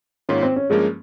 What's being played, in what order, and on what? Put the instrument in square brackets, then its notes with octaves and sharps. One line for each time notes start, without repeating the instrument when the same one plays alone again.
[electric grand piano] G#2 D#3 A#3 F4 [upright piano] C#4
[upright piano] C4
C#4
[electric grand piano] G2 F3 A#3 C#4 [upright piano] G#3